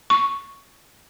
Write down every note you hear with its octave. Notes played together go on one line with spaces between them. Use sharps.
C#6